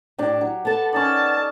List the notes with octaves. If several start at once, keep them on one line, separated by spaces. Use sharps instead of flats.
A2 D4 G4
F#3
B3 A4 A5
C#4 D#4 D5 A5